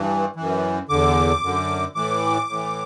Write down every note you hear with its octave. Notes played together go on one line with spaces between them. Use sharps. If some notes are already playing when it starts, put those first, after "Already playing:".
Already playing: G2 E3
F#2 E3
E2 D3 D6
F#2 D3
A2 E3 D6
A2 E3